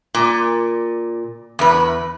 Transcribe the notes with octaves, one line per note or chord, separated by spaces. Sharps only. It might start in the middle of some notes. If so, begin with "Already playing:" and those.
A#2
E2 B4